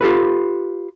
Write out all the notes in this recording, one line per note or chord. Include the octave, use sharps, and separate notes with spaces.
F4 G4 A4 B4